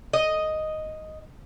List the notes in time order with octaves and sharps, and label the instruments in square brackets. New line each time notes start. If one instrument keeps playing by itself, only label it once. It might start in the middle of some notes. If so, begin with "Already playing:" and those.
[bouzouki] D#5